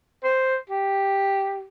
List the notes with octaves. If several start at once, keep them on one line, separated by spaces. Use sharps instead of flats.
C5
G4